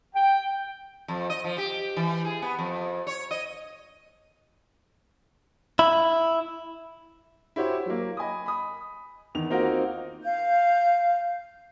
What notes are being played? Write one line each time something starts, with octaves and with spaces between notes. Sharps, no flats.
G5
F2
D#5
F3
G4
E3
G#4
B3
F2
C#5
D#5
E4
E4 F#4 G4 C5 C#5
F#3 A#3
D#5 G#5 B5 D#6
B5 D#6
E2 D#3 F7
A#3 C4 D#4 F4 F#4 A#4
F5 G6